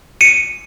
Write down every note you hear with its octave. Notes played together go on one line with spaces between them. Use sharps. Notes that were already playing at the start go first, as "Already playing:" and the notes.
C#7 D#7